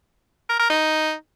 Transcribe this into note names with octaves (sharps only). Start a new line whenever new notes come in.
A#4
A#4
D#4